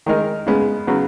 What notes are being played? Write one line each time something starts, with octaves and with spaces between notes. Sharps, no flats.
D#3 G#3 D#4 A#4
C#3 G#3 B3
C#3 F#3 B3